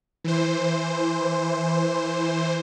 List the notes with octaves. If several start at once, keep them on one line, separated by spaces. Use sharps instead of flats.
E3 C5